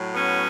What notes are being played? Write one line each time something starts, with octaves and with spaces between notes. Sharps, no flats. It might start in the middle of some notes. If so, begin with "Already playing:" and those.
Already playing: A2 F#3
B3 C#4